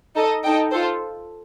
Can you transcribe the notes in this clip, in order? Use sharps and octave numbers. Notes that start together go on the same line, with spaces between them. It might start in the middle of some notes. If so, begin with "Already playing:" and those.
D#4 A4 D#5
D#4 A4 D#5 G5
F4 A4 C5